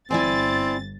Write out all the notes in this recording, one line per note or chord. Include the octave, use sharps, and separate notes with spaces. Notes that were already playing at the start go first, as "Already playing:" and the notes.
G1 C4 E4 D5 G#5 A6